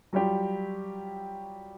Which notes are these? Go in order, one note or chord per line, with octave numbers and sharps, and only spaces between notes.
F#3 G3 F4 G4